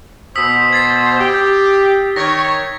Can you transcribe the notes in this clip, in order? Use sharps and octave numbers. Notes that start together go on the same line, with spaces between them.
B2 C5 D#6 E6 B6
G#6 A6 C7
G4
D#3 C#5 G#6 A#6